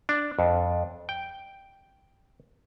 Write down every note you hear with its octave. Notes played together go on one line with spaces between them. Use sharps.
D4
F2
G5